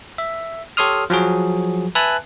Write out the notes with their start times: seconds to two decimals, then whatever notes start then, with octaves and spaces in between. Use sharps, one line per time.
0.18 E5
0.77 G4 A4 C#5 C6 D#6 F6
1.10 F3 F#3 F#4 G#4
1.95 B4 E5 G#5 A5 F#6